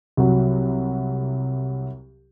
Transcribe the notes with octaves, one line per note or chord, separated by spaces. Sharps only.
C2 F#3